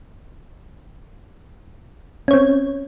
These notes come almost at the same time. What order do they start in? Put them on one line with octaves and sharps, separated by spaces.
C#4 C#5 C4